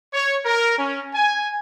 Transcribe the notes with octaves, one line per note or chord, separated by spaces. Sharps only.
C#5
A#4
C#4
G#5